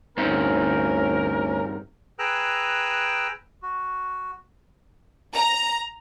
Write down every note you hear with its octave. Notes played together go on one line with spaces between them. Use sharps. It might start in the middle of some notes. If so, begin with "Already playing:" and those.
D2 G2 C4 C#4 D#4 A#4
G#4 B4 G5 A#5 E6 F#6
F#4
A#5